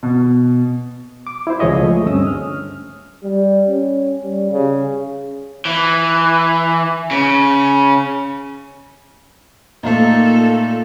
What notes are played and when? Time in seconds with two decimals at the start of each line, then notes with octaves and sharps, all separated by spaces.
0.03 B2
1.27 D6
1.47 E4 C5
1.59 C#2 F3 G#4 C#5 D#5 E5
1.82 G#3 A3
2.06 D2 G2 C4 C#4 D#6 E6
2.27 F6
3.24 G3
3.68 C#4
4.23 G3
4.51 C#3
5.65 E3
7.11 C#3
9.83 A#2 A3 A#3 D#4 A4